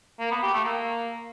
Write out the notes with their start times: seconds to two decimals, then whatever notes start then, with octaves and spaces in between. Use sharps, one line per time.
0.20 A#3
0.31 B3
0.42 G4
0.53 A3
0.65 A#3